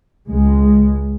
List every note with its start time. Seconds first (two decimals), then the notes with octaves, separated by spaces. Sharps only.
0.28 C#2 G#3